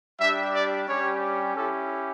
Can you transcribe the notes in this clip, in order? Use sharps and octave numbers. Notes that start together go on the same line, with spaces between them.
G3 D4 G4 E5
D5
G3 C#4 G4 C#5
C#4 E4 G4 A4